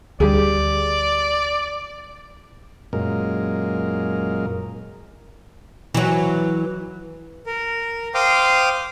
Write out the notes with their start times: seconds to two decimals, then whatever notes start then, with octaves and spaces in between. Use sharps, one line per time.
0.20 D2 G3 G4 G#4 D5
2.93 F#2 A#2 G#3 A#4
5.94 E3 F#3
7.46 A#4
8.15 C5 F5 G5 D6 D#6 F6